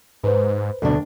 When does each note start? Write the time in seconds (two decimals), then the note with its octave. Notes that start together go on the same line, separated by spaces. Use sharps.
0.23 G#2 B4 C5
0.82 D2 B2 D4